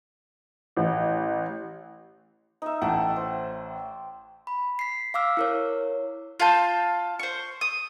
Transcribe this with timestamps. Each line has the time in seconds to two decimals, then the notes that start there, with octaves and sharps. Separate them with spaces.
0.77 A1
2.62 D#4 E5
2.82 A1 E5 F#5 G5 A5
3.16 C5
4.47 B5
4.79 B6 C7
5.14 F5 D6 E6 F6
5.37 E4 A#4 C#5
6.40 F4 F5 A5 G6
7.19 C5 C#6
7.61 D#6